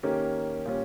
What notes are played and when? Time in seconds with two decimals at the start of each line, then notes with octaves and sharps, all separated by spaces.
0.03 D#3 A#3 C#4 G4
0.65 A#2 G3 C#4